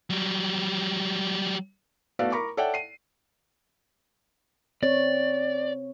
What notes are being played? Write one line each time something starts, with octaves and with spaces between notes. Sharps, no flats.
F#3 G3
A3 B3 F#4 A4 D5 F5
A#4 A#5 B5 C#6 D6
A4 C#5 D5 E5 F#5 G5
C7 D#7
C4 C#5 D5